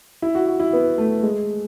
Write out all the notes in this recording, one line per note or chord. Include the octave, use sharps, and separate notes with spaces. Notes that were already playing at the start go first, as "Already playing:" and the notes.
E4
F#4
F#4
E4
B3
A3
G#3